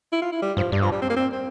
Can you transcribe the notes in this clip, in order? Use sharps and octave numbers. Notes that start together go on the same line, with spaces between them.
E4
F4
E4
G3
G2 F3
G2 G3
F3
G3
C4
A#3
C4
C4